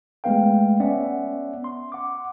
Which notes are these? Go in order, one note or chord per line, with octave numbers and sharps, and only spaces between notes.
G#3 A3 B3 B4 F5 G5
B3 C#4 D5 E5 F#5
C6
F#5 D6